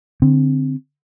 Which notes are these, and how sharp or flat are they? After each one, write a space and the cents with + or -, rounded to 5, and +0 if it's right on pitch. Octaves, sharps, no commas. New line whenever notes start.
D3 +0 C4 +0